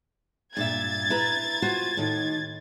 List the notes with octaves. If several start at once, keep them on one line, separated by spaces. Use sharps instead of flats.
G2 A#2 E5 G#6 A6
E4 B4 A#5
F4 F#4 C5
A2 D#3